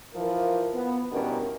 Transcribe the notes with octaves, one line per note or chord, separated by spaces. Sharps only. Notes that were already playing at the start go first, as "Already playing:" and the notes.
E3 F3 A#4
B3
G2 B2 E3 C#4 A#4